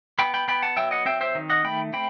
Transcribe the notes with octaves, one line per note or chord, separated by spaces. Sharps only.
B3 G5 B5
G5 B5
B3 G5 B5
F#5 A5
F#3 E5 G5
D#5 F#5
C4 E5 G5
C5 E5
D#3
D#5 F#5
A3 G5 B5
C4 G5 B5